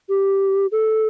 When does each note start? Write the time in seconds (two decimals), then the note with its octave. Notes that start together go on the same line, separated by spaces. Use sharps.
0.09 G4
0.72 A4